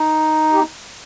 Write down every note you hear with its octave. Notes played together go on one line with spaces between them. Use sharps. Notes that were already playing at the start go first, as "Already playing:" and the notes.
Already playing: D#4
G4